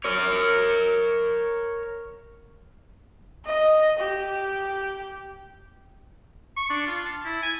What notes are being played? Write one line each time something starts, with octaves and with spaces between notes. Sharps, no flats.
A#4 C#5
D#5
G4
C#6
D4
F4
A5
E4
G#5